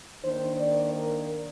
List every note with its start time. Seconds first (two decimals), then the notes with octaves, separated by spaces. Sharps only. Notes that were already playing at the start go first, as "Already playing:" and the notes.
0.24 D#3 A#3 D4 C5
0.59 D5
0.94 A#4